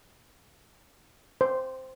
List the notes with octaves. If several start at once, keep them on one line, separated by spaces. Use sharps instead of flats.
C5